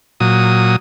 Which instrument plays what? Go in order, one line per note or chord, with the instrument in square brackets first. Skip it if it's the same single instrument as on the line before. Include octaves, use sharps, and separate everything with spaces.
[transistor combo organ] A#2 F#3 D#6